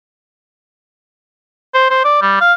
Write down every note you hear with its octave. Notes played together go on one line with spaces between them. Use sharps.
C5
C5
D5
G3
F5